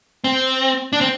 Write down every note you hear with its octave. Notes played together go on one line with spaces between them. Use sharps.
C4
D4
C4